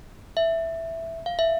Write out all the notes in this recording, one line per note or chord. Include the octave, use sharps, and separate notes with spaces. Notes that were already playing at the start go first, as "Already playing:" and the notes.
E5
F5
E5